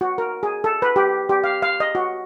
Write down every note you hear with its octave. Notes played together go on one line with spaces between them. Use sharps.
F#4
A#4
G#4
A4
B4
G4
G4
F5
F5
D#5
F#4